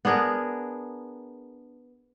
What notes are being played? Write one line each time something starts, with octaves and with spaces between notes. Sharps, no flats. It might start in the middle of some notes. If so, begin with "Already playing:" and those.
B3 D4 G#4 A#4